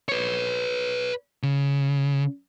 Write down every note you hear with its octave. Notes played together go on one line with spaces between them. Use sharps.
B4 C#5
C#3